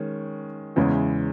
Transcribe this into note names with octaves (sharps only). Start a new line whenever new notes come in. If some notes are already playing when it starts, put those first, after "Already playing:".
Already playing: D#3 G#3 C#4
E2 C#3 E3 G#3 C#4